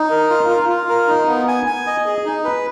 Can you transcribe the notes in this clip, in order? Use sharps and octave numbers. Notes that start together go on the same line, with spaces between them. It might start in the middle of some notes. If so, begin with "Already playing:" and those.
Already playing: D#4
A#4
F4
F4
F4
A#4
D#4
B3
G#5
G#5
D#5
G#4
D#4
B4